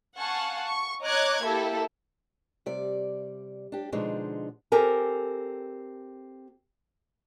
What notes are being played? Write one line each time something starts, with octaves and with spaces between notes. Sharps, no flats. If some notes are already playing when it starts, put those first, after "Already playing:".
F5 F#5 G#5 A5 C#6
C#6
C#5 D#5 A#5 D6 F#6 G#6
A#3 E4 G4 A4 E5
C3 G3 D5
D4 G4
B2 D3 F3 G#3 D4 D#4
C4 G4 A4 A#4 G#5